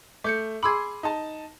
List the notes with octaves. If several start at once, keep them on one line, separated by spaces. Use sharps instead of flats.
A3 D6 G6 C#7
G#4 B5 C6 D6 E6 G#6
D#4 A5